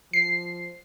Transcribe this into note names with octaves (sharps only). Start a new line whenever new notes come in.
F3 C7